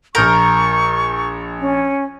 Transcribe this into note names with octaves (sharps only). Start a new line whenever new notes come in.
A#1 A#4 C#6 G6 F7
C#4